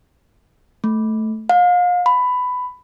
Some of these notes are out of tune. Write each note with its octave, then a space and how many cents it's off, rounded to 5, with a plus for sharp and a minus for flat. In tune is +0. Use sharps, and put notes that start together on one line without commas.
A3 -5
F5 +35
B5 +15